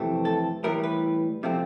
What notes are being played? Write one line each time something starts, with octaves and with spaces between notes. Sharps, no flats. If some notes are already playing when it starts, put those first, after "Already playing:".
Already playing: F2 C3 E3 A3 C4
A4
A2 E3 G3 A#4
B4
C3 F3 A3 C4